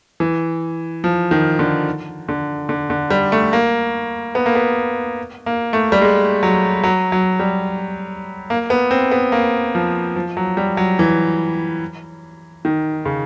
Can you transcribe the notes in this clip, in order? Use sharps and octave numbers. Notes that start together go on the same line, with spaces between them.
E3
F3
D#3
D3
D3
D3
D3
G3
A3
A#3
B3
A#3
B3
A#3
A3
G3
G#3
F#3
F#3
F#3
G3
A#3
B3
C4
B3
A#3
F3
F3
F#3
G3
F#3
E3
D#3
C#3